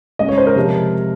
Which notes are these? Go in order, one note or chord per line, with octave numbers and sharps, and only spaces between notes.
C#3 G#3 D#5
C#5
C5
A#4
C3 F3 G#3